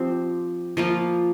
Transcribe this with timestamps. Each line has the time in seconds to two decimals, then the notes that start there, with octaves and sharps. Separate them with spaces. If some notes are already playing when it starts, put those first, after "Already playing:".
Already playing: F3 C4 G4 C5
0.77 F3 A#3 F4